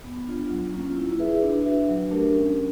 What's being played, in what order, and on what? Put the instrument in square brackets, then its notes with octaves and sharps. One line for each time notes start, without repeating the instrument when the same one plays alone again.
[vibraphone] B3
D4 F4
F#3
A#3 C#4 F4
E4
G#4 B4 E5
D4
F#4 B4 E5
F#3
A3 D4 G4 A#4
C#4